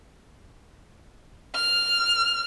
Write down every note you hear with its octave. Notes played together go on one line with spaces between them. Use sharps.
F6